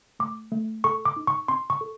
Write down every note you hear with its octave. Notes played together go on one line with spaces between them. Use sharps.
A3 D6
A3
A4 C#6
D6
D#4
C#6
C4 C6
C#6
A4